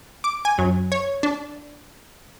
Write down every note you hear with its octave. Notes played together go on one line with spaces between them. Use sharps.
D6
G#5
F#2
C#5
D4